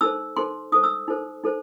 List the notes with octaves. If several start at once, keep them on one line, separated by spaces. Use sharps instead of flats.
D#4 A4 C5 E6
D#4 A4 C5 C6
D#4 A4 C5 D#6
E6
D#4 A4 C5
D#4 A4 C5